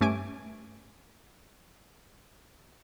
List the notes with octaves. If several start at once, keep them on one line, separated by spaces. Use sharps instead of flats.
G2 A3 C#4 G#5 D6 D7